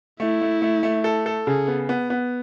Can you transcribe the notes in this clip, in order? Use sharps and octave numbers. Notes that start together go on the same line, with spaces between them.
A3 E4
A3
A3
A3
A4
A4
C#3 G#4
B3
B3
B3